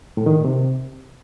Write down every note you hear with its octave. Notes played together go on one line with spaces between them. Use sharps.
A2
D#3
A#2
C3